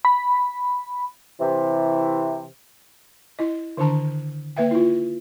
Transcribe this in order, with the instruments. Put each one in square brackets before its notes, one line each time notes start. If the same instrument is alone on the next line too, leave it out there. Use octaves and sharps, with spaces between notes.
[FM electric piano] B5
[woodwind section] C3 E3
[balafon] E4 D#5
D3 D#3 D4 A5 A#5
A#3 B4 E5 G5
E4 F4